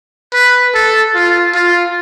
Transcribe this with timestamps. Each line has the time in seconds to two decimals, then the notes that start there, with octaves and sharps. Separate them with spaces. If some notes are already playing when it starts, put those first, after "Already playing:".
0.33 B4
0.74 A4
1.15 F4
1.55 F4